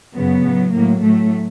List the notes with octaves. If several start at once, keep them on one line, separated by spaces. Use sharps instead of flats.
F#2 C#3 F#3 B3
A2 F#3
A2 F#3 A#3
A2 F#3 A3